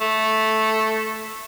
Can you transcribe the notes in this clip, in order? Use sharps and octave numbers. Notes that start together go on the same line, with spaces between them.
A3